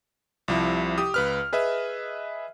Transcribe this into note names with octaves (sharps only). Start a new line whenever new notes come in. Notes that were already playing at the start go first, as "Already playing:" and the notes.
C2 C3 F3 E4
G4 D#6
C#2 B4 F6
G#4 B4 D#5 E5